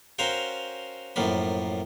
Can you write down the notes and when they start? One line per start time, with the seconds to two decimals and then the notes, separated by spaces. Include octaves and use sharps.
0.19 C#4 F#4 A#4 C5 F5 G5
1.16 F#2 A2 F3 A#3 B5